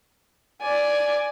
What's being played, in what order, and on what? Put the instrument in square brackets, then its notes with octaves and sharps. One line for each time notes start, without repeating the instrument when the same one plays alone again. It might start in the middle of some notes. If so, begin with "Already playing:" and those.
[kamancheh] D5 G#5